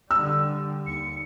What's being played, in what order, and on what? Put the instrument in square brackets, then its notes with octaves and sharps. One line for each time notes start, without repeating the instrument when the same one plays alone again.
[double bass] D3 G3 [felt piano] E6
[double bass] D#2 [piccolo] C#7